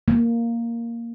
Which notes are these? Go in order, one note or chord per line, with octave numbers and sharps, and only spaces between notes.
A#3